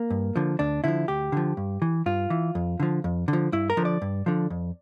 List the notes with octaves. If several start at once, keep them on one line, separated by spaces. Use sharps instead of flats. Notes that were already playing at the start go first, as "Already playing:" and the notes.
Already playing: A#3
G2
D3 F3
D2 D4
D3 F3 E4
D2 G4
D3 F3
G2
E3
G2 F4
E3
F2
D3 F3
F2
D3
F3
G2 E4
A#4
D3 F3
D5
G2
D3 F3
F2